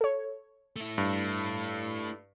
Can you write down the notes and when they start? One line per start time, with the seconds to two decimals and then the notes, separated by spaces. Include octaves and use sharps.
0.01 A4 C#5
0.76 A3 E4
0.98 G2